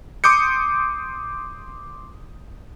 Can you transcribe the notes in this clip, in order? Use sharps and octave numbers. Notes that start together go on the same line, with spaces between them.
C6 D6 D#6 G6 C#7